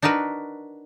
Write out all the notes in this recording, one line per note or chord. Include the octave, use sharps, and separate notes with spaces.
D4 D#4 F#4 A#4 B4